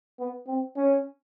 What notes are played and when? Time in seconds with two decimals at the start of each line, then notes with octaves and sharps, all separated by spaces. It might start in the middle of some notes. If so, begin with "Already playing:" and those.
0.19 B3
0.47 C4
0.77 C#4